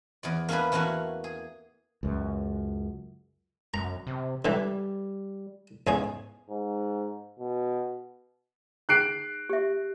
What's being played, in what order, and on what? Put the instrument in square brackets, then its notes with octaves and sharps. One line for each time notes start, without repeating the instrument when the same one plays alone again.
[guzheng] E2 G#4 D5
A#3 C#4 D4 G#4 B4
E3 A3 A#3 C#4 F#4
G#4
[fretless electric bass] C#2 F#2
[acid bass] F#2 [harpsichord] A#5
[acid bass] C3
[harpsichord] D3 E3 [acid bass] G3
[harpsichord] E2 C#4 G#4 [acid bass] G#2
[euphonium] G#2
B2
[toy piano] D#4 G#4 G5 [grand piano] F#6 C7 D7
[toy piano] G4 E5